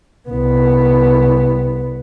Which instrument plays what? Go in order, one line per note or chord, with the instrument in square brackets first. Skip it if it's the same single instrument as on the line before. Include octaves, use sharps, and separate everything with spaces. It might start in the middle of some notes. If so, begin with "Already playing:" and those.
[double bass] C2 B3